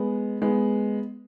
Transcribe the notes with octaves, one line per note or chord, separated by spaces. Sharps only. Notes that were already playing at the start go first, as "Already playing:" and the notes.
Already playing: G#3 B3
G#3 B3